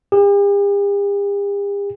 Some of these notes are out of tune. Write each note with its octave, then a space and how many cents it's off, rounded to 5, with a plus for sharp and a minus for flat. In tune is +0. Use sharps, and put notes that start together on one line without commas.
G4 +45